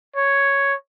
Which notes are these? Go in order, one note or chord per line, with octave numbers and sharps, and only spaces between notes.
C#5